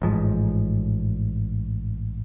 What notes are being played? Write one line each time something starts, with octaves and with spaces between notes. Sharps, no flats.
A1 G#2 F3